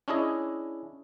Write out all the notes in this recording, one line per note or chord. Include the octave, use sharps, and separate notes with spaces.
C#4 D4 E4 G#4 D#5